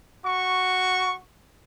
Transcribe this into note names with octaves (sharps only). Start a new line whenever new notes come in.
F#4 C#6